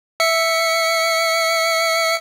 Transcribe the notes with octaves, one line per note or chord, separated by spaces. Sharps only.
E5 C#7